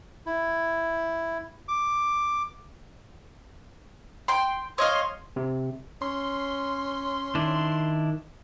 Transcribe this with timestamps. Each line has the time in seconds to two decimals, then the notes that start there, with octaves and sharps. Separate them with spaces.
0.26 E4
1.68 D6
4.28 G5 C6
4.78 C#5 D#5 F5 C6
5.36 C3
6.02 C#4 C6
7.35 D#3 D4 E4